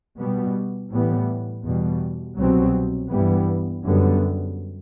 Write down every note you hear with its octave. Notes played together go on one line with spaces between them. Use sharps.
B2 G3 B3
A2 E3 G3 B3
E2 B2 G3
C2 B2 F#3 C4
G2 E3 G3 B3
F#2 D3 G3 B3